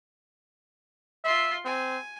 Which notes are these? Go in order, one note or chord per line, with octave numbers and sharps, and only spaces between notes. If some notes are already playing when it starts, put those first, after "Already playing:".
F4 E5 C6
C4 G#5